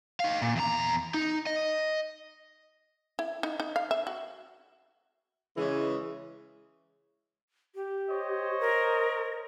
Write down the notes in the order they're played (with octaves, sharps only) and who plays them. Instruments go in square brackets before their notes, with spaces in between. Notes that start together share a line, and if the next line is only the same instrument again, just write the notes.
[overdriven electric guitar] D#4 F5
A#2
E2 A#5
D#4
D#5
[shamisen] E4
D#4
D#4
F5
E5
F#4
[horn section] C#3 E3 G#3
[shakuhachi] G4
[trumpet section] C5 C#5 D#5
[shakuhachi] A#4